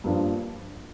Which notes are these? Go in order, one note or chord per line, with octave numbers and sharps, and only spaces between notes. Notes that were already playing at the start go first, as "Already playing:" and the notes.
G2 F3 A#3 D4